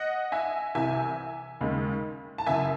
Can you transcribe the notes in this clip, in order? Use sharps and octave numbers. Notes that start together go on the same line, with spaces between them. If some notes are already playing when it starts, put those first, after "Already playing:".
Already playing: D#5 F#5
E5 G#5
C2 C3 E3 E5 G#5
D#2 C#3 G#3
A5
F#2 C#3 E3 E5 G#5